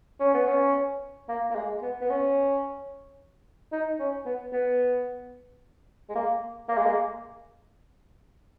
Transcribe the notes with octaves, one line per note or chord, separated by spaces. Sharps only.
C#4
B3
C#4
A#3
A#3
G#3
B3
B3
C#4
D#4
C#4
B3
B3
G#3
A#3
A#3
G#3
A#3